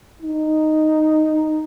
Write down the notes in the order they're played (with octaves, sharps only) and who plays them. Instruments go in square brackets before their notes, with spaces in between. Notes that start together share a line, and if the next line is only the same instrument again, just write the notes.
[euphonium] D#4